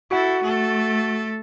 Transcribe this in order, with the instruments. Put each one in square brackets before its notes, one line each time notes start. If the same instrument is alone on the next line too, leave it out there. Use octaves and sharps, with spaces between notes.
[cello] E4 A4 [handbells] F#4 F#5
[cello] A3 A4